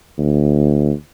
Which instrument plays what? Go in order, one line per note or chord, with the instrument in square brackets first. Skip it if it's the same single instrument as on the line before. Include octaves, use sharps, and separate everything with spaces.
[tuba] D2